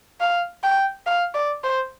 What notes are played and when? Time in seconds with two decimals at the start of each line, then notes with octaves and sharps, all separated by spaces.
0.20 F5
0.63 G5
1.06 F5
1.34 D5
1.64 C5